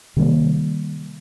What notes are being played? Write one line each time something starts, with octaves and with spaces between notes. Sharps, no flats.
C3 D#3 G3 A#3